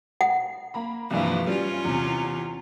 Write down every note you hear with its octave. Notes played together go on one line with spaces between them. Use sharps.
F#5
A#3 A#5 B5
C2 G2 E3 F3 A#3
G3 C#4 F4
E2 C3